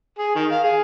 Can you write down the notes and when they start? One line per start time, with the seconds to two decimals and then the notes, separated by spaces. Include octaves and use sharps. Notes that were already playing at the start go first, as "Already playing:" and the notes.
0.19 G#4
0.35 D#3
0.51 F5
0.64 G#4